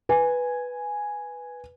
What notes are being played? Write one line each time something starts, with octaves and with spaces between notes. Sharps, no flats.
B4 G#5